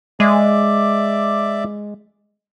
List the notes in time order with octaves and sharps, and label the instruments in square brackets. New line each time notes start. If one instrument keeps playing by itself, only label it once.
[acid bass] G#3 [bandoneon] D5 E5 D6